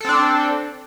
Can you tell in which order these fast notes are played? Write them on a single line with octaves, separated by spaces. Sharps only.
A4 C4 D4